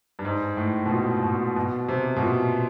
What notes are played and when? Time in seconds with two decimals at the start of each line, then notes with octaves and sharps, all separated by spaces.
0.19 G2
0.25 G#2
0.57 A2
0.86 B2
0.90 A#2
1.23 B2
1.56 B2
1.88 C3
2.16 B2
2.22 A#2